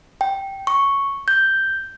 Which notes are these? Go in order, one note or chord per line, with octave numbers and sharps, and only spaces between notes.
G5
C#6
G6